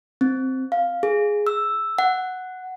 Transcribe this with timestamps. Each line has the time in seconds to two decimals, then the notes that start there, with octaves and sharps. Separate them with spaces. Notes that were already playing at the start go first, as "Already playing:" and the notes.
0.21 C4
0.72 F5
1.03 G#4
1.47 E6
1.98 F#5